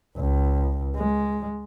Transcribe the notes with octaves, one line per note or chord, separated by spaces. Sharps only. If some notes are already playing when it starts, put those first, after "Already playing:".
C#2
G#3